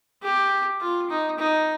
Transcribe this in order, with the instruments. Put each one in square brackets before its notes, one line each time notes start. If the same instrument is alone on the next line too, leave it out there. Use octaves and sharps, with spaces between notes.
[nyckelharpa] G4
F4
D#4
D#4